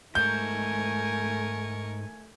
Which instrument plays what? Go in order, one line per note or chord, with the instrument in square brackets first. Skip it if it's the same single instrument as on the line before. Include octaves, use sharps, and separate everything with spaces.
[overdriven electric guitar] G#2 [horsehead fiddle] A3 G#5 [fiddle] A#4 C#6 [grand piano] G6